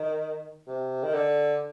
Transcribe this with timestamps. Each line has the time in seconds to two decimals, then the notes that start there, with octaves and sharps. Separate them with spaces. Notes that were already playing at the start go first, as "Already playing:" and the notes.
Already playing: D#3
0.67 C3
1.03 D#3
1.14 D3